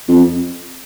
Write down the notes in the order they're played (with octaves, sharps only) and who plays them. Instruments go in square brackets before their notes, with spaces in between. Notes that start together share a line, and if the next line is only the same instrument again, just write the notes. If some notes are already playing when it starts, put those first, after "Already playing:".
[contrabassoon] F2